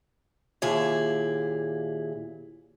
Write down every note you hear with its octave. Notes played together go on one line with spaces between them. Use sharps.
D#2 A#2 E4 G#4